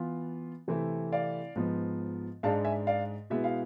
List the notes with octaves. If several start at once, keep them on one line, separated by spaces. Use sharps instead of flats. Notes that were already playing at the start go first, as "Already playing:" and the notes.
Already playing: E3 B3 F4
C3 E3 A3 C4 E4
D5 F5
G#2 F3 B3
G#2 G#3 D4 F5 A5
E5 G#5
D5 F5
B2 G#3 B3 E4 E5
F5